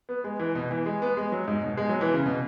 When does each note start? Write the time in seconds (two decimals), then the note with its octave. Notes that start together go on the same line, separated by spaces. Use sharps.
0.09 B3
0.24 G#3
0.39 E3
0.55 B2
0.71 E3
0.86 G#3
1.02 B3
1.17 G#3
1.32 F#3
1.48 G#2
1.63 B2
1.77 G#3
1.89 F#3
2.01 E3
2.13 C#3
2.26 B2